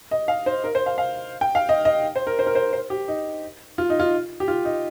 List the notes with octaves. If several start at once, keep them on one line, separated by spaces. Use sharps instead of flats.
D#5
F5
C5
A#4
C5
F5
F5
G5
F5
D#5
D#5
C5
A#4
C5
A#4
C5
C5
G4
D#4
F4
D#4
F4
G4
F4
D#4